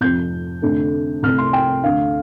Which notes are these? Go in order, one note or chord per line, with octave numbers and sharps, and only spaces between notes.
F1 F2 F3 G6
F1 F2 D3 A3
C2 C3 A3 F6
C6
G5
D2 D3 A3 F5